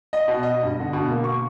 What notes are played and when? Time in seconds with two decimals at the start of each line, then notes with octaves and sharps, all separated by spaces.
0.13 D#5
0.28 B2
0.43 D#5
0.63 G2
0.80 D3
0.93 B2
1.09 A#3
1.24 C#6